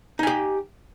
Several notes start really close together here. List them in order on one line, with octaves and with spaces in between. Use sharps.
D#4 G#5 G4